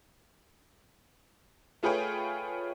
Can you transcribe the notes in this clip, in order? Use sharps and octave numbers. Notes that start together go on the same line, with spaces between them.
A3 F4 G#4 B4 C#5 G5